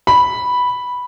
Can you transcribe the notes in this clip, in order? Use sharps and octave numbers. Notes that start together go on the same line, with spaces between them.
B5